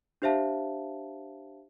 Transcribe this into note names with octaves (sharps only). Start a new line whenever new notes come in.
D4 G4 C5 E5 F5 A5